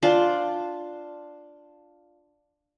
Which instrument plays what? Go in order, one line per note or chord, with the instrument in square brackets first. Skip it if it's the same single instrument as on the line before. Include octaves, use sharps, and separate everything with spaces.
[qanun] D4 F4 C5